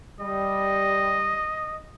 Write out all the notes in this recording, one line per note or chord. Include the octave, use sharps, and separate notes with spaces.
G3 D#5